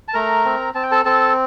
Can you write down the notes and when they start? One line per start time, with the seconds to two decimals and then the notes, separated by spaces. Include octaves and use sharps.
0.08 A5
0.14 A3 A#4 A#5
0.45 C4
0.74 C4 A5
0.83 G5
0.91 A4 A5
1.05 C4 A4 A5